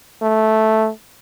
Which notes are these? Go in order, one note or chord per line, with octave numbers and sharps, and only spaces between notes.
A3